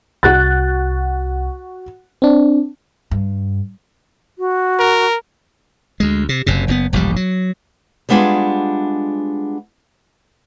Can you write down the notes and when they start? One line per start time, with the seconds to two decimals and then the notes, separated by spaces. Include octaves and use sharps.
0.23 C2 F#4 F#6 A6
2.22 C4 D4
3.11 G2
4.39 F#4
4.79 A#4
6.00 D2 G#3
6.29 C3
6.46 F#1 F#2 C3
6.68 F#1 A#2 B3
6.93 E1 A#1 G2 G3
7.16 F#3
8.09 G3 G#3 B3 D4 F4 G#4